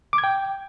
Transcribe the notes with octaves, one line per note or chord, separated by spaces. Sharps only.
D6
G#6
G5